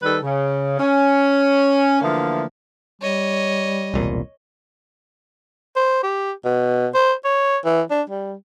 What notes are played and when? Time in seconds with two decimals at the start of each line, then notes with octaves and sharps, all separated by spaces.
0.02 D#3 G3 A4 B4
0.23 C#3
0.79 C#4
2.02 D3 E3 F3 A3 A#3
3.02 G3 C#5 D#5
3.94 E1 C2 A#2
5.76 C5
6.03 G4
6.45 B2
6.94 C5
7.25 C#5
7.65 E3
7.91 D4
8.10 G3